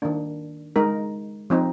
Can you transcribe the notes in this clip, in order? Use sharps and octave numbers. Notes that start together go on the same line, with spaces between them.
D#3 A#3 D4
G#3 D#4 A#4
F3 C4 D#4